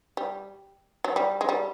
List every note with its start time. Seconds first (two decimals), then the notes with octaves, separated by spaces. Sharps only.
0.17 G3
1.04 F#3
1.16 G3
1.41 G#3
1.49 G3